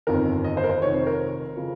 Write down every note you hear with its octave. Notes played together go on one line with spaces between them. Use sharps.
G1 F2 D#3 A#4
D#5
C5
A#4
C5
F1 F2 D#3 C#5
C5
A#4
C#3 F3